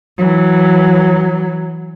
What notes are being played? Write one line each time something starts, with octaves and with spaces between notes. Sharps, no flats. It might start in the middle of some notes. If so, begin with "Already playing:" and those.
E3 F#3